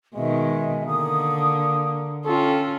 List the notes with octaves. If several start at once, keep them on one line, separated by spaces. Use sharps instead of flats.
B2 D#3 G#3 E5
D3 A#3 D#6
C#4 F4 A4 G5